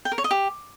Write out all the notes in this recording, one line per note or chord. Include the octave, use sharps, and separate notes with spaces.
G5
A#4
C#5
D#5
G4